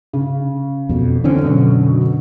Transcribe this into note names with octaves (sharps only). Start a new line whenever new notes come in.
C#3
F2 B2
D3 E3 C4 C#4
F#2 B2 F#3